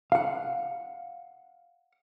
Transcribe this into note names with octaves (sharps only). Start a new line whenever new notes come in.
F5 F#5